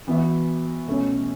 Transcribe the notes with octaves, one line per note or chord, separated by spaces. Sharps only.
E3 B3 F#4 B4 E5
B2 A3 C#4